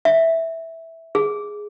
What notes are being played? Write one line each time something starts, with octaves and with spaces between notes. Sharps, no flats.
E5
G#4